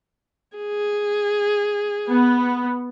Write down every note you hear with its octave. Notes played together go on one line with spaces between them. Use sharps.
G#4
B3